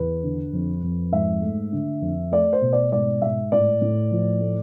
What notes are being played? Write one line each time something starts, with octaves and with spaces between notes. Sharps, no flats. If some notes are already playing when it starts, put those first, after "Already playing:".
Already playing: E2 B4
D3
F2
F2
G#2 E5
A3
D3
F2
A3 D5
C5
B2
D5
G#2 D5
G#2 E5
A2 D5
A2
F3
A3